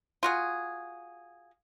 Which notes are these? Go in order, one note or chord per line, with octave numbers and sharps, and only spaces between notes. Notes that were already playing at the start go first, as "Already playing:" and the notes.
F4 F#4 G#4